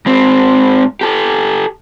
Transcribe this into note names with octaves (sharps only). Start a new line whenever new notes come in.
G#2 C4
G4 A4